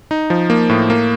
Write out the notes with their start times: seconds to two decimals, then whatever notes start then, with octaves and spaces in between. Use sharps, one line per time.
0.11 D#4
0.30 F3
0.50 A#3
0.69 A2
0.90 A#3